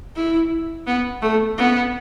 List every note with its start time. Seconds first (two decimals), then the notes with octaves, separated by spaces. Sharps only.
0.16 E4
0.87 B3
1.22 A3
1.58 B3